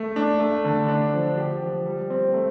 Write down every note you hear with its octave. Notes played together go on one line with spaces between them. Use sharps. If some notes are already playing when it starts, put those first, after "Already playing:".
Already playing: A3
D4
A3
D3
D4
F3
G4
F3
G3
C4
A3